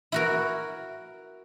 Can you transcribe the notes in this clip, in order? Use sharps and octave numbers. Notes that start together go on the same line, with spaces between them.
E4 F#4 A#4